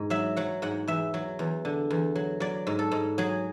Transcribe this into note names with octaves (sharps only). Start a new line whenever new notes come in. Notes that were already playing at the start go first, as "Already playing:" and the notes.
Already playing: G#2
F#3 E5
F#3 F#5
G#2 F#5
E2 E5
F#3
E2
D3
E2
F#3
F#3 D5
G#2
A4
G#2
F#3 G#4